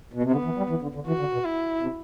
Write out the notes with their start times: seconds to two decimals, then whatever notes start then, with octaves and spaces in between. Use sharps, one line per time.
0.13 B2
0.23 C3
0.32 D3 B3
0.45 E3
0.57 G3
0.70 E3
0.82 D3
0.95 D3
1.07 E3 F#4
1.19 D3
1.33 B2
1.45 E4
1.82 C3